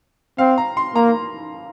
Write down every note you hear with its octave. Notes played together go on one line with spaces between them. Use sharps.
C4 F5
A#5
C6
A#3 A#5